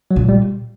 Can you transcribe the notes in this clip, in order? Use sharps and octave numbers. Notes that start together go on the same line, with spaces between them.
F#3
A#2
G3